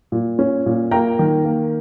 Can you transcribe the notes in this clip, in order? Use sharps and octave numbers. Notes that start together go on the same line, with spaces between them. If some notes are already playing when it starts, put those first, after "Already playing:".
A#2
C#4
A#2
A#3 G5 A#5
D#3
A#3